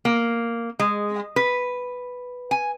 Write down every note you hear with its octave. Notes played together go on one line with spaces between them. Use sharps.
A#3
G#3
B4
G#5